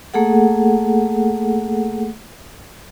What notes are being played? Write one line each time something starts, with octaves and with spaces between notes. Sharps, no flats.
A3 A#3 G#4 A4 F#5